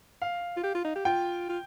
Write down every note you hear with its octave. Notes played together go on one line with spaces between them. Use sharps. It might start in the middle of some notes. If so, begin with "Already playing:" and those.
F5
F4
G4
F4
D#4
G4
F4 G5
F4